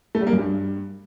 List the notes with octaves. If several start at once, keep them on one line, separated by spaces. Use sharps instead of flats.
A3
G3
A#3
F#2
G2